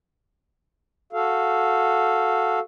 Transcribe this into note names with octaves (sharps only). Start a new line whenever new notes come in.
F#4 A4 F5